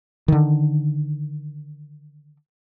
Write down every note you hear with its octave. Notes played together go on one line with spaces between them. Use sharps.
D3 D#3